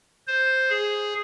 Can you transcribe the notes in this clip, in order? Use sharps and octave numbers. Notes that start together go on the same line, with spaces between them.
C5
G#4